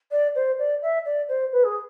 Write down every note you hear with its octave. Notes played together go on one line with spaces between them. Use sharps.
D5
C5
D5
E5
D5
C5
B4
G#4